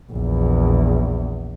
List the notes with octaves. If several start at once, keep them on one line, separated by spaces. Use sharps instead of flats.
A#1 E2